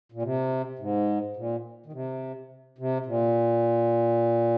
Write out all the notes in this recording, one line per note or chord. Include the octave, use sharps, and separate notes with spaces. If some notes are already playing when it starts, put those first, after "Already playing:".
A#2
C3
G#2
A#2
D#3
C3
C3
A#2